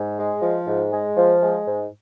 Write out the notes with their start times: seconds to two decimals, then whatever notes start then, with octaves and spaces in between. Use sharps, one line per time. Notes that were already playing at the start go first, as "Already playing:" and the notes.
Already playing: G#2
0.18 G#3
0.42 F3
0.67 G#2
0.92 G#3
1.16 F3
1.42 G#3
1.67 G#2